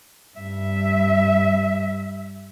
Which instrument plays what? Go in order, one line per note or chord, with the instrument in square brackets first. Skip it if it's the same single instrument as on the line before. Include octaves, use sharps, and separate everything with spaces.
[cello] G2 E5